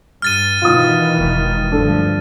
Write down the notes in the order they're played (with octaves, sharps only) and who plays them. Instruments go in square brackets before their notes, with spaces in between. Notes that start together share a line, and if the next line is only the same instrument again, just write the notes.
[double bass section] G2 [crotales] F6 A6 D#7
[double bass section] B2 D#3 E3 [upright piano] F4 D#6
[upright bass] E1 G#3
[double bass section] D2 G2 F3 [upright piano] D4 A4